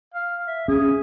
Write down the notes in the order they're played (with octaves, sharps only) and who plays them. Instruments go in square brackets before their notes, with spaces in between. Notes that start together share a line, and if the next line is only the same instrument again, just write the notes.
[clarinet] F5
E5
[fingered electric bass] C#4 [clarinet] G#4